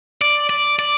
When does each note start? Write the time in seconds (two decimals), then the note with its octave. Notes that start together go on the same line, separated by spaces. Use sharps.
0.21 D5
0.49 D5
0.79 D5